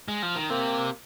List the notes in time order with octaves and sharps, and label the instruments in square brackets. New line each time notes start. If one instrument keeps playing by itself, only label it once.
[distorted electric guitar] G#3
F3
D#3
[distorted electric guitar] C3 [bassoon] A#3